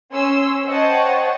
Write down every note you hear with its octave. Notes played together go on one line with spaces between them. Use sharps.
C#4 C6 E6
C5 C#5 D#5 F#5 G5 A5